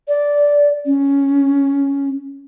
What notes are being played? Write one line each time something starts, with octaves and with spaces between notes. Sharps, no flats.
D5
C#4